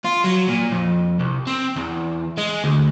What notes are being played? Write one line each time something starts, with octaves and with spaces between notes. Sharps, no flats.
F4
F#3
A#2
F2
C2
C4
E2
G#3
D2